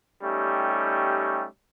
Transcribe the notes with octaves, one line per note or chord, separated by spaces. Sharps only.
G3 A3 C#4 D#4 G4